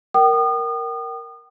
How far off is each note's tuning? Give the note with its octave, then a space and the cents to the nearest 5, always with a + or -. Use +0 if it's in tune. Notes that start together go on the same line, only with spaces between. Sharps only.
A#4 +0 G5 -35 D#6 -35